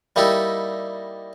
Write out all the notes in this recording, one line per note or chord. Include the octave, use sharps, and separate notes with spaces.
G3 A#3 D#4 E4 G4 A4